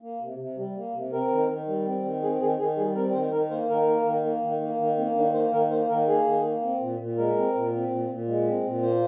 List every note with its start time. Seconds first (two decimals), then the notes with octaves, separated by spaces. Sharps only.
0.02 A#3
0.20 C3
0.38 C3
0.57 G3
0.75 A#3
0.94 C3
1.12 C4 A#4
1.31 D#3
1.49 D#3
1.67 G3
1.85 C4
2.04 D#3
2.22 C4 G#4
2.40 D#3 G#4
2.59 D#3 G#4
2.77 G3 G#4
2.95 C4 A#4
3.13 D#3 C5
3.32 D#3 A#4
3.50 A#3 C5
3.69 D#3 A#4
3.87 A#3
4.06 D#3
4.24 A#3
4.42 D#3
4.61 A#3
4.79 D#3
4.98 A#3 C4
5.16 D#3 D4
5.34 A#3 C5
5.52 D#3 A#4
5.71 A#3 C5
5.89 D#3 A#4
6.08 A#3 G#4
6.26 D#3
6.44 A#3
6.62 C4
6.80 A#2
6.99 A#2
7.17 G#3 A#4
7.36 C4
7.54 A#2
7.72 C4
7.90 A#2
8.09 A#2
8.27 G#3
8.46 C4
8.64 A#2
8.82 A#3 C5